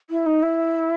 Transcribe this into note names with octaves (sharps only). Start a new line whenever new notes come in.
E4
D#4
E4